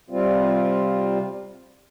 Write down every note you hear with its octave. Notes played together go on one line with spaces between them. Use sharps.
C3 G3 C4 F4